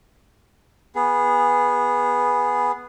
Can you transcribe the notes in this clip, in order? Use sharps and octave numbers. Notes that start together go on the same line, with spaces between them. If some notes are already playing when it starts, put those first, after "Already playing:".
B3 G#4